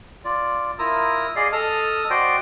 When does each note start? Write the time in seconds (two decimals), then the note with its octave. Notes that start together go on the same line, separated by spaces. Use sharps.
0.25 F4 D5
0.79 E4 F4 A#4 A#5 D#6 E6
1.36 G#4 D5 D#5 F5
1.52 A4 D#5 A5 D#6 F6
2.10 F#4 C5 D5 D#5 G5